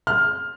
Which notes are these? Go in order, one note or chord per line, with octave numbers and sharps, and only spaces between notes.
F6